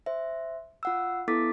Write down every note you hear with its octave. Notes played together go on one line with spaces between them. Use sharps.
C5 E5
F4 F#5 E6
B3 E4 A4 D6 A6 B6